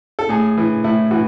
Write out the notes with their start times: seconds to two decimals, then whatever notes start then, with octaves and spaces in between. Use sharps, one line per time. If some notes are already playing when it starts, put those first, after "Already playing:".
0.19 A4
0.29 A2 G#4
0.58 E3
0.84 A2 E4
1.11 E3 F#4